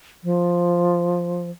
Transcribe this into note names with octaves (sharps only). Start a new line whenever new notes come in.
F3